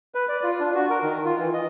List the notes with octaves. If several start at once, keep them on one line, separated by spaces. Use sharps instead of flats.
B4
D5
F4
D4
F#4
A#4
D#3
F4
E3
D#5